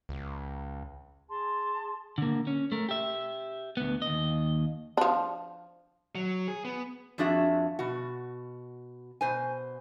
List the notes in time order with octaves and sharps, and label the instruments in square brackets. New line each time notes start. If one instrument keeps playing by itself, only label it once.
[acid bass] C#2
[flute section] G#4 A5 C6
[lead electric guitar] D3 A#3
C#4
A3 A#4
G4 E5
D2 B3
D#2 D#5
[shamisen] F3 D4
[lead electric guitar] F#3
G#4
B3
[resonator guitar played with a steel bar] F2 F3 D4 F#4 G#4 E5
B2 F#4
B2 C5 G#5